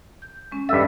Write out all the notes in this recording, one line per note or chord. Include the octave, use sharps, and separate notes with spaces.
G6
G#3 C#4
G2 C#4 A4 D#5 E5